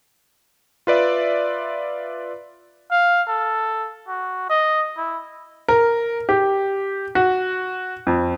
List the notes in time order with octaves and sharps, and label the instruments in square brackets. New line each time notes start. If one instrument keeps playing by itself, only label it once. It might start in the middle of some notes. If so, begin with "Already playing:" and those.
[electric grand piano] F4 B4 D5 E5
[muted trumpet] F5
A4
F#4
D#5
E4
[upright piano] A#4
G4
F#4
F2